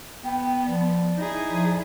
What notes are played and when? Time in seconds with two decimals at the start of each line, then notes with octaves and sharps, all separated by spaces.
0.24 B3 G5
0.65 F3 D5
1.17 D#4 E4 G#4
1.48 F3 D5